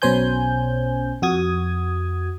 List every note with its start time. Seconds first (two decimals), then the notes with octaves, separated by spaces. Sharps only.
0.02 B1 B2 C#4 C5 G#5 G6
1.22 F2 F#4 D#6 G#6